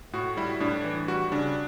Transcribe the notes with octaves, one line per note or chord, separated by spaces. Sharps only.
A2 F#4
G3 E4
A2 D4
E3
G3 F#4
C#3 D4